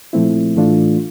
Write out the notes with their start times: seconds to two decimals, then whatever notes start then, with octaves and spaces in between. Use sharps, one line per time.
0.13 A#2 F3 A3 C4 E4
0.56 A2 E3 A3 D4 F4